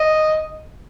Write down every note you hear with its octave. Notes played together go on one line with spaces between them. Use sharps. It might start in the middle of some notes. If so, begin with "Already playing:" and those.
Already playing: D#5